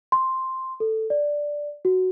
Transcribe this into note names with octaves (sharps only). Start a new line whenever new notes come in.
C6
A4
D5
F#4